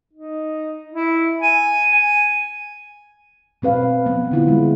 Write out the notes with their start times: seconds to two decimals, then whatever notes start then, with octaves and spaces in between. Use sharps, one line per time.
0.13 D#4
0.93 E4
1.42 G#5
1.92 G#5
3.62 B2 C4 B4 F5
4.06 F3 B3
4.31 D3 E4 F4
4.46 G3 G#3